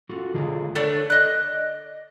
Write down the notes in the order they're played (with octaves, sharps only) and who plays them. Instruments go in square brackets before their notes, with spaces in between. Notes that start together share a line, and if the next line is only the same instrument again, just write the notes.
[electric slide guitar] F4 F#4 A4
D3 F4 G#4
[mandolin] A3 D4 C#5 [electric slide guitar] A4
[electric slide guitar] D5 [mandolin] D#5 F#6